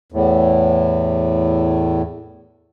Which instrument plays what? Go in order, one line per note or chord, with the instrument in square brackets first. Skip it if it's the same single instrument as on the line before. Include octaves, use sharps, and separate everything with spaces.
[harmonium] E2 A2